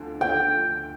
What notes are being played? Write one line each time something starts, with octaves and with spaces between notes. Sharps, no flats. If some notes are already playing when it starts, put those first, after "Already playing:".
Already playing: D2 D3 F3
D2 G5